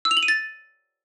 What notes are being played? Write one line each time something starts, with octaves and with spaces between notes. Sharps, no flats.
E6
F7
F#7
D#7
A6